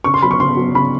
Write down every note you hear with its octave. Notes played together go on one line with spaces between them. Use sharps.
C#3 C#6
C6
F#3 B3 B5
C#6
C#3 C6
F#3 B3
C#3 B5